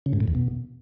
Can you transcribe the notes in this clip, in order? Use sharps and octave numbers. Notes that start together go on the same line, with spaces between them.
C#3
G#2
A2
E2
B2